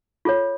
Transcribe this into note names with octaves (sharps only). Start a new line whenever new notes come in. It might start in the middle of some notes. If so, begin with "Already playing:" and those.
F4 A4 C#5